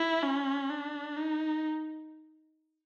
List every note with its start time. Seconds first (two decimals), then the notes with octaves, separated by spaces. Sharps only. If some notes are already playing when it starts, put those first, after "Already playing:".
Already playing: E4
0.23 C#4
0.70 D4
1.17 D#4